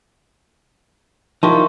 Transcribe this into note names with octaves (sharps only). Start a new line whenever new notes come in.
F3 D#4 E4 G4 A#4 A5 C6 C#6